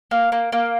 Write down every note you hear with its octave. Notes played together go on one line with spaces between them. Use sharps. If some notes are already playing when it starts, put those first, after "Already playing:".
A#3
A#3
A#3